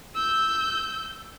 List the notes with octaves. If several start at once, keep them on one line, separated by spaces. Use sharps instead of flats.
E6 G6